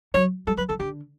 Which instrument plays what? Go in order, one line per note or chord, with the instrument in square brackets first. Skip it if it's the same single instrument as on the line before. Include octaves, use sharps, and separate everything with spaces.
[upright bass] F#3 [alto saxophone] C#5
[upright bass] G3 [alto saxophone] A4
[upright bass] F#3 [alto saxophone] B4
[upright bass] E3 [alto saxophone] A4
[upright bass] D3 [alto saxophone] G4